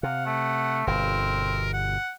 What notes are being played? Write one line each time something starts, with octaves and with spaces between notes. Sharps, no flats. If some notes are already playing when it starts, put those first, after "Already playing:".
C3 F5 F#5
A3
G1 B2 C4 A#4
F#5